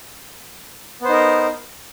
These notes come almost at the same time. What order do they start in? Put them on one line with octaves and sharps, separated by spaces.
B3 C5 D#4 A#4